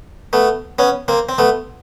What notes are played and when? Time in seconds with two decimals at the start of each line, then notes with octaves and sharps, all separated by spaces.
0.33 A3 B3
0.79 B3 C#4
1.08 A#3 C4
1.29 C4
1.38 A3 B3